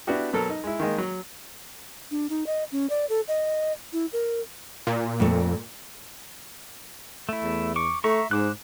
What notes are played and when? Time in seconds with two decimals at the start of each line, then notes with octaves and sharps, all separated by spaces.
0.07 B3 D4 E4 F#4 G4
0.33 B2 F#3 A4 A#4
0.50 D#4
0.64 G#3 E4
0.80 D#3 G#3 A#3 D#5
0.98 F#3
2.11 D4
2.30 D#4
2.47 D#5
2.72 C#4
2.90 D5
3.09 A4
3.28 D#5
3.93 E4
4.13 A#4
4.87 A#2
5.20 F2 A3
7.29 A3 E4
7.43 E2
7.76 C#6 D6
8.04 A3 E5 A#5 C#6
8.31 G#2 C5 D6 F#6